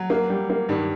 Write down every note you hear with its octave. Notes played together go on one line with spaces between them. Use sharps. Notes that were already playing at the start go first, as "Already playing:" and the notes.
Already playing: F#3
A#3
G3
A#3
G2 D#3 G3